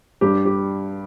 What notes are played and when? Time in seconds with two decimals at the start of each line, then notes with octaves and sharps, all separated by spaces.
0.21 G2 G4
0.45 G4